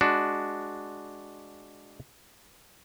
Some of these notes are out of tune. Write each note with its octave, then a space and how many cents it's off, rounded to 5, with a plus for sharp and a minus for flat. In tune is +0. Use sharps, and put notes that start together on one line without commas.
G#3 +5 D4 +0 F#4 +0